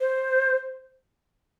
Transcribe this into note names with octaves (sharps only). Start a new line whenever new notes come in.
C5